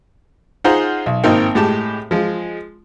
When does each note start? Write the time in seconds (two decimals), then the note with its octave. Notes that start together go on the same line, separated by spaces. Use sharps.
0.64 D#4 F4 G#4 C5 F#5 A#5
1.06 B1
1.24 G#1 A#3 C4 D#4 A#4 G5
1.55 A2 G#3 G4 A5
2.11 F3 G#3